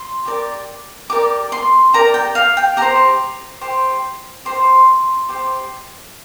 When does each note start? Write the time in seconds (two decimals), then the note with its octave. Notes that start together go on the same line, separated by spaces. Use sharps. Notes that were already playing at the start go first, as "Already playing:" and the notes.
Already playing: C6
0.25 G4 A#4 D5
1.10 G4 A#4 D5 D6
1.52 C6
1.93 G4 A#4 D5 A#5
2.14 G5
2.35 F5
2.57 G5
2.77 G4 C5 A#5
3.61 G4 C5
4.45 G4 C5 C6
5.29 G4 C5